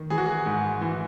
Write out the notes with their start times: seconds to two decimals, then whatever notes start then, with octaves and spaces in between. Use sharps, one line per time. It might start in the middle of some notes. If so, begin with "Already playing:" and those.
Already playing: D#3
0.10 E3 G#4
0.18 F#4
0.26 G#4
0.46 G#2
0.81 E3